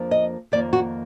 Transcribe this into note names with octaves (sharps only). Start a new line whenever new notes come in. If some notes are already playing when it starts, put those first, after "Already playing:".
Already playing: F2 F3 A#3 D4
D#5
F2 D#3 A#3 D5
F#4